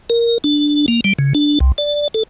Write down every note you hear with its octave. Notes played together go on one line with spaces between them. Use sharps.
A#4
D4
A#3
G3
C#3
D4
C2
D5
A4